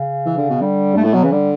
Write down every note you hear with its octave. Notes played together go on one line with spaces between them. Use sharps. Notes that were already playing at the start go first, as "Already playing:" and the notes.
Already playing: C#3
E3
D3
B2
D3 G3
G2 A3
A2 A3
B2 F#3
C#3 E3
D3 G3